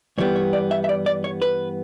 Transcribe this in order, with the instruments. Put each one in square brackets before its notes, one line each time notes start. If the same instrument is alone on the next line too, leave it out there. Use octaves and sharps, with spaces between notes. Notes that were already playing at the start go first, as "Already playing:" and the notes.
[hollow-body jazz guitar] G2 E3 G3 B3 C#5
C#5
D5
E5
E5
D5
D5
C#5
B4